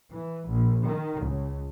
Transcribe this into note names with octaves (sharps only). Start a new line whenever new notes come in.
E3
A#1
D#3
C#2